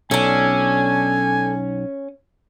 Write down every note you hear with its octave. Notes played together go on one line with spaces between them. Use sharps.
B1 C#4 D4 A4 G#5